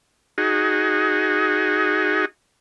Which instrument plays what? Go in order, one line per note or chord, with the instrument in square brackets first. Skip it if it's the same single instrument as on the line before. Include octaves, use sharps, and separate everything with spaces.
[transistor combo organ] D#4 F#4 G#4